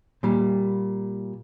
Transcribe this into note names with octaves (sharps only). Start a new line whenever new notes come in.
A#2 G3